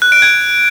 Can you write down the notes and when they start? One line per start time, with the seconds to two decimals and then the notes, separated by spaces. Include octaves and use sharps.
0.02 F#6
0.12 D7
0.22 G#6